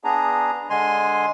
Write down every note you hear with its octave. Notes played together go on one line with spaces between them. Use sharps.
B3 D4 G#4 A#5
D3 G#3 G#5 C6